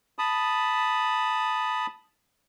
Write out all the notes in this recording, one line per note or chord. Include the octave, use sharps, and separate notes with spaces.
A5 B5 D#6